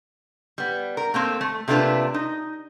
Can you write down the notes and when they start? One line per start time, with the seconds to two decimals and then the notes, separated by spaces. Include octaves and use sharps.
0.58 G3 B3
0.97 A#4
1.14 A3 A#3 C4
1.41 A3
1.68 C3 A3 A#3 D4 F4 B4
2.14 D#4